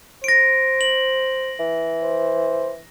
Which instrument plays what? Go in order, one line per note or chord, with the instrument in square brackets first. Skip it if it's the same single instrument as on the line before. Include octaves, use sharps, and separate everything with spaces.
[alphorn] C5 [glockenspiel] A#6 D7
[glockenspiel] F#7
[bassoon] E3
[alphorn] C5